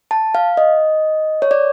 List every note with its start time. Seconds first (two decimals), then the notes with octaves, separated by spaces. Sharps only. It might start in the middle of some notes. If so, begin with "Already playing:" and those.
0.11 A5
0.35 F5
0.57 D#5
1.42 C#5
1.51 D5